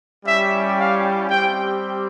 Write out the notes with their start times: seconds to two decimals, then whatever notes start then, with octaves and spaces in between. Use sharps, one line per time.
0.25 G3 C#4 E4 G4 E5
0.77 F5
1.29 G3 C4 G4 G5